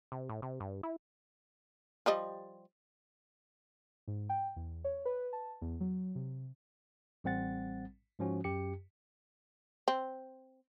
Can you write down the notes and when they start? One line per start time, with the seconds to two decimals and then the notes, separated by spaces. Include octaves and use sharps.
0.12 C3
0.29 A2
0.42 C3
0.60 G2
0.83 E4
2.06 F3 G3 D#5
4.08 G#2
4.29 G5
4.56 E2
4.84 C#5
5.05 B4
5.33 A5
5.62 E2
5.80 F#3
6.15 C3
7.24 A1 G3 C4 F#5 A6
8.19 G#2 F3 C#4 F#4
8.44 F#2 G4 C#7
9.88 C4